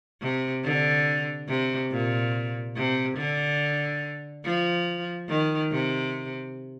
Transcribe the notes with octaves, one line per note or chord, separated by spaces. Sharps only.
C3
D3
C3
A#2
C3
D3
F3
D#3
C3